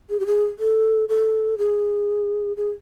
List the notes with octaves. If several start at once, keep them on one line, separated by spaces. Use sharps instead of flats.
G#4
G4
G#4
A4
A4
G#4
G#4